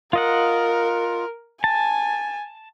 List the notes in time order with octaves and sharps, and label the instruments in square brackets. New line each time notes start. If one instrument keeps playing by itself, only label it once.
[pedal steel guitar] F4 D#5 F#5 [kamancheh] A#4
[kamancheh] G#5 [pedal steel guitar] A5